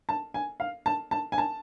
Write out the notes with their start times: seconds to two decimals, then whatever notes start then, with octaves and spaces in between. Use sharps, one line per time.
0.09 A5
0.34 G#5
0.60 F5
0.86 A5
1.11 A5
1.32 G#5
1.38 A5